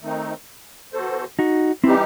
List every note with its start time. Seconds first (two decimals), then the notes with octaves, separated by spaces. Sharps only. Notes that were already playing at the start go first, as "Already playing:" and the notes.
0.02 D#3 A3 C4 D#4
0.93 E3 B3 F#4 A4 C5
1.39 D#4 F#4
1.84 E3 G3 C4 D#4 E4 G4